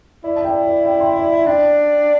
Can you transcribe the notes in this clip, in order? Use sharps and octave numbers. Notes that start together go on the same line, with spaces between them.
E4 D5
A5
D5 G5
D5
D5 G5
G5 C6
D5
E5
D4 D5 G5